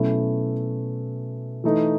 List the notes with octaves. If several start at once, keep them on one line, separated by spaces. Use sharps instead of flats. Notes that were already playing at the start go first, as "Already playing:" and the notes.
Already playing: B2 F#3 A3 C#4 E4
E3 A3 D#4